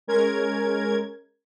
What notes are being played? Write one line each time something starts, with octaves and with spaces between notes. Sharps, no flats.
G#3 C#4 A#4 G#6